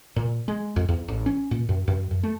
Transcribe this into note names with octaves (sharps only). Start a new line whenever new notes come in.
A#2
G#3
F2
E2
A1
C#4
A#2
F#2
F#2
F#2
A3